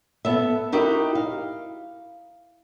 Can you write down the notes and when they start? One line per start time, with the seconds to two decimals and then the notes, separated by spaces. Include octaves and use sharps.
0.25 B3 A4 E5
0.72 D#4 E4 F#4 G4 A#4
1.15 F5